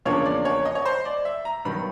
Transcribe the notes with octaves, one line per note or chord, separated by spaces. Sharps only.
E2 C#3 F3 A#3 D4 C#5
D5
C#5
D#5
C#5
C5
D5
E5
A#5
G2 D#3 F#3 B3 B5